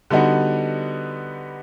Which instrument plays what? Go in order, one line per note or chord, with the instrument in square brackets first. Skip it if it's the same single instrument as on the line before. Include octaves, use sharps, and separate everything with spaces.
[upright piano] D3 G3 B3 D#4 F#4